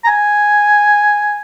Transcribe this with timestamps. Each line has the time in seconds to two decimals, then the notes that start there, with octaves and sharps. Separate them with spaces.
0.04 A#5
0.07 G#5